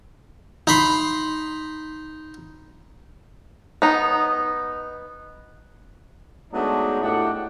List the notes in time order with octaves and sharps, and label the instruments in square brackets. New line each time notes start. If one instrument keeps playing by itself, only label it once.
[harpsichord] D#4 B5 C6
[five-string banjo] B3 D#4
[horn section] F#3 G#3 A3 B3 D4 D#4
A2 A3 D4 D#4 G4 F#5